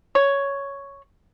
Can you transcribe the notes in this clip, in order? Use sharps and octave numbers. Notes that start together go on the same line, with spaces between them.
C#5